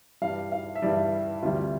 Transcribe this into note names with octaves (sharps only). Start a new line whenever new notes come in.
G2 E3 G3 F5
F5
E5
G2 E3 G3 D5
D2 C3 E3 G3 F4